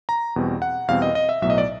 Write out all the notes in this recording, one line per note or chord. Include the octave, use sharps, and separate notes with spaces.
A#5
E2 B2 G3 C4
F#5
E2 B2 G3 C4 F5
D#5
D#5
E5
B1 A2 F#3 B3 E5
D#5
D5